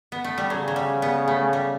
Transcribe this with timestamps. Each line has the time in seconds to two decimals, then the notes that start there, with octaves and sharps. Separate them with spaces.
0.12 B3
0.24 A3
0.38 G3
0.50 C#3 F#3
0.68 F#3
0.76 G3
1.02 B3
1.28 A3
1.53 G3